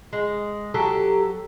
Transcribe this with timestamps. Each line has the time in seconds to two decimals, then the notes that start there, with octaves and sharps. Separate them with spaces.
0.13 G#3
0.74 F#3 G4 A4